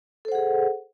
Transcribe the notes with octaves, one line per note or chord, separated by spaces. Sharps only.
G#4 A4 C5 F#5